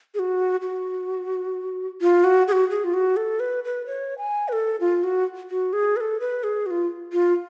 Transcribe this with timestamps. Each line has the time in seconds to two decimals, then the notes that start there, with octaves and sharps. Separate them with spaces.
0.14 G#4
0.19 F#4
0.62 F#4
2.01 F4
2.24 F#4
2.48 G#4
2.52 F#4
2.70 G#4
2.84 F4
2.94 F#4
3.17 A4
3.40 B4
3.64 B4
3.86 C#5
4.18 G#5
4.48 B4
4.52 A4
4.80 F4
5.03 F#4
5.50 F#4
5.73 G#4
5.96 B4
6.01 A4
6.20 B4
6.43 G#4
6.66 F#4
6.71 F4
7.13 F4